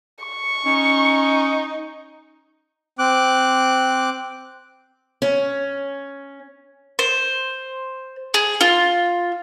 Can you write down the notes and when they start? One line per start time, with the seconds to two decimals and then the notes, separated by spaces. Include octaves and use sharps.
0.25 C#6
0.65 C#4 D#4
2.99 C4 D6 F#6
5.22 C#4
6.99 C5
8.34 G#4
8.61 F4